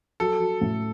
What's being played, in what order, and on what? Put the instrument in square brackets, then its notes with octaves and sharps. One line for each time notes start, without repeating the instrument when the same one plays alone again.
[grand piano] F#3 [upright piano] A4
[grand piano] F#3
A2